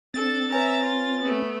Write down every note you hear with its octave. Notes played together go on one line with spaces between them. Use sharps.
C4 D4 A4 A6
B4 C#5 E5 G#5 A#5
F4
A3 B3